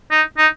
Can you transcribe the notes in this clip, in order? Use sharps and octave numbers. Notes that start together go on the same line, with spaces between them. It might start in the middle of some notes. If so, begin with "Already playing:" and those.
D#4
D#4